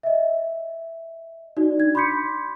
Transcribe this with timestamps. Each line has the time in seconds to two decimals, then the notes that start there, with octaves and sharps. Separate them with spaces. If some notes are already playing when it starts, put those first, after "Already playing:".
0.03 D#5 E5
1.57 D#4 F#4 D5
1.78 D4 G#6
1.95 B5 C6 D6 G6 B6 C#7